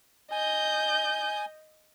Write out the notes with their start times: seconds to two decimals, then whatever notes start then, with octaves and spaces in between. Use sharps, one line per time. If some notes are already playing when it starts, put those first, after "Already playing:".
0.31 D#5 G#5 G6